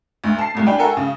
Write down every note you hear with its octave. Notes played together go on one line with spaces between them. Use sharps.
D2
A5 C7
C2 A2
D4 G5 G#5 B5
F#4 A4 A#4 E5 G5 G#5
C#3